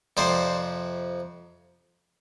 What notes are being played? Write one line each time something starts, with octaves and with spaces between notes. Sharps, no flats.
F2 C3 F3 C5 D5